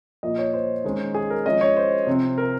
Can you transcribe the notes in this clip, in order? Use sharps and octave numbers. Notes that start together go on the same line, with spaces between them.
A#2 F3 A#3 D#5
C#5
C5
D#3 G#3 C#4
G#4
A#4
F3 G#3 C#4 D#5
C#5
C5
C3 F3 C4
A#4